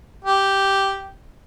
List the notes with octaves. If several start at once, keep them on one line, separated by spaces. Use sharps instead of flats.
G4